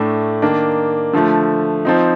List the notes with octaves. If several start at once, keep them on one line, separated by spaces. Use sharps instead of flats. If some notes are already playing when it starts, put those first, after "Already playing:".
Already playing: A2 A3 D4
D#3 A#3 D4
D3 F3 A3
F3 C4 D#4